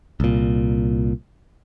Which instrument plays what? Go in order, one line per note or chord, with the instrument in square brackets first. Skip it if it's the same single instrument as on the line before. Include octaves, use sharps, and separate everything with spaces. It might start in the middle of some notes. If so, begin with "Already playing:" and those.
[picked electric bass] C2 A#2